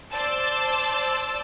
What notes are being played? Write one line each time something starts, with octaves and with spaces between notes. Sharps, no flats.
C5 D5 A5 E6